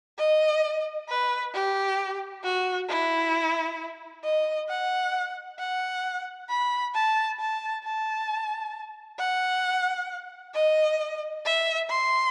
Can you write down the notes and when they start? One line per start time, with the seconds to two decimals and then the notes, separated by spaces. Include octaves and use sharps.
0.18 D#5
1.08 B4
1.53 G4
2.43 F#4
2.88 E4
4.23 D#5
4.69 F#5
5.59 F#5
6.49 B5
6.94 A5
7.39 A5
7.84 A5
9.19 F#5
10.54 D#5
11.45 E5
11.89 C6